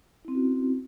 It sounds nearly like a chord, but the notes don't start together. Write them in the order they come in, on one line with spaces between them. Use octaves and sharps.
E4 C4 C#4 F#4